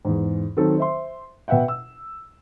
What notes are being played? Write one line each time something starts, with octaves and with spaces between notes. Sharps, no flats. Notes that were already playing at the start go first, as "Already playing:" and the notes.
E2 G#2
D#3 F#3 C4 A4
C5 E5 C6
B2 B4 E5 F#5 G5
E6